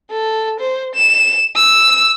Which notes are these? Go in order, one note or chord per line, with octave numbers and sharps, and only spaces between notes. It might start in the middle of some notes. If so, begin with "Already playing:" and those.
A4
C5
E7
E6